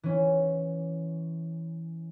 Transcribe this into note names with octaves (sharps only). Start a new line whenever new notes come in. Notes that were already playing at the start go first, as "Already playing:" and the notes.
E3 C#4